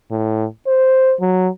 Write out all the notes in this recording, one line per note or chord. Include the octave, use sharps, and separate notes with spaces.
A2
C5
F#3